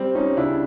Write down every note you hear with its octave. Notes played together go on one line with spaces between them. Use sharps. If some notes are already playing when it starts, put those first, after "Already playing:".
Already playing: G3 C4
G3 C#4 D#4
C#3 D4 E4